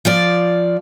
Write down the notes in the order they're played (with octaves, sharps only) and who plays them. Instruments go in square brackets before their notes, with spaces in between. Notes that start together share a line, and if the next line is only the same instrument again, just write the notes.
[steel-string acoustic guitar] F3 F4 D5